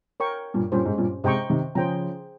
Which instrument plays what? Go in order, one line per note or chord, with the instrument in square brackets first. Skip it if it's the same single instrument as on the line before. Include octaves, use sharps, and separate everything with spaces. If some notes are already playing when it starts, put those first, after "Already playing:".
[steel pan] A#4 C#5 G5 C#6
[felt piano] G2 A#2
[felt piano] G2 A#2 [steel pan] C#4 G4 C5
[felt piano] G#2
G2 A#2
[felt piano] G#2 C3 [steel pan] C5 D#5 G5 A#5 C#6
[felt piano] C3 D#3
[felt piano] C#3 F3 [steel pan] G#4 C5 G5 A#5